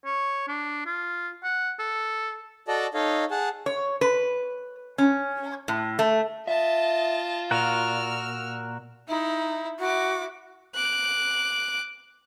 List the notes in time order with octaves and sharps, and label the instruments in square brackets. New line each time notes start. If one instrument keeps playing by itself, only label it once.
[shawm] C#5
D4
F4
F#5
A4
[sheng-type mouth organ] F#4 A4 D5 D#5 A5
D#4 A4 C#5 D#5 F5
G#4 F#5 A5
[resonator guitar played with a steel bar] C#5
B4
C#4
A2
A3
[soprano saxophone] F4 [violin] D#5 A5 [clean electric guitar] E5
[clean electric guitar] A#2 [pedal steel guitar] F#4 A#4 F#5 [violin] E6 F6
[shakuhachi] D#4 [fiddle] E4
[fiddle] E4 D6 [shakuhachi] F#4
[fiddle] D6 F#6